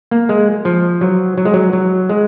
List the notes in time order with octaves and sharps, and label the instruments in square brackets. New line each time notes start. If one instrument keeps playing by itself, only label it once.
[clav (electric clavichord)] A#3
G#3
F3
F#3
F#3
G#3
F#3
F#3
G#3